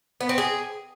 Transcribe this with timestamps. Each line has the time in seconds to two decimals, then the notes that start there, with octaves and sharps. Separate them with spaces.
0.21 B3
0.29 C4
0.38 G#4